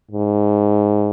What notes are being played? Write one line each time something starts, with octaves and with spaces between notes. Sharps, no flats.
G#2